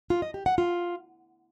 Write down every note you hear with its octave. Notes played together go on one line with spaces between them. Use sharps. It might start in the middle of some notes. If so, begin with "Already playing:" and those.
F4
D#5
G4
F#5
F4